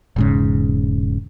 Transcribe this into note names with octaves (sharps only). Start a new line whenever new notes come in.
E1 G#2 C#3